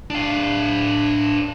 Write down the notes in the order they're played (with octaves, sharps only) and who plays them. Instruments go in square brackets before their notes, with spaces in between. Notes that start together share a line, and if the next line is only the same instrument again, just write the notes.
[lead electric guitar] D4 F5